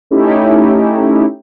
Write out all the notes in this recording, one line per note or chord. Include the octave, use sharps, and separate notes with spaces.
A3 C#4 D#4 E4 G4